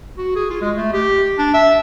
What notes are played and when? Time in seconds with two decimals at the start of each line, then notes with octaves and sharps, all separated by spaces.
0.18 F#4
0.35 G#4
0.50 F4
0.62 G#3
0.76 A3
0.93 G4
1.38 D4
1.54 E5